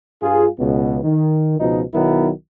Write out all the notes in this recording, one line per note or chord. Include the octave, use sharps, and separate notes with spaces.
G2 F4 G#4
C#2 B2 B3
D#3
C#2 B2 F3 D#4
B1 D#3 F#3 B3 E4 A#4